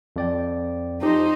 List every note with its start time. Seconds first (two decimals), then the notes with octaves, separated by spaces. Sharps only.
0.16 F2 D5 G5
1.02 F3 D#4 G4 C5